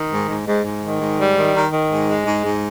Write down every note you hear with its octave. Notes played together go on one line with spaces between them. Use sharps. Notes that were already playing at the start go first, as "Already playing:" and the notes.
Already playing: D#3
G#2
G#2
G#2
G#2
D#3
G#2
G3
D#3
D#3
D#3
G#2
G#3
G#2
G#2